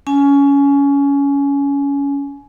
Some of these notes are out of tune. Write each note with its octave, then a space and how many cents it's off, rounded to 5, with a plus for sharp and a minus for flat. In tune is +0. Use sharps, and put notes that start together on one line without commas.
C#4 +20 G#5 +20